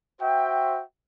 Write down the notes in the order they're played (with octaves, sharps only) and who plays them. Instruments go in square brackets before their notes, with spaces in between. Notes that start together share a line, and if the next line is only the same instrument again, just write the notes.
[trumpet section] F#4 C5 E5 G5